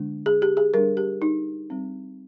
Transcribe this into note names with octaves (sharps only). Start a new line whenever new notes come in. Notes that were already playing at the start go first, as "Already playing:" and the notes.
Already playing: D3 G#3 D4
G#4
G4
G#4
G3 D4 A#4
G4
D#4
G3 C4